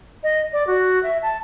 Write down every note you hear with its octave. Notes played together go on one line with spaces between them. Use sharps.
D#5
D5
F#4
E5
A5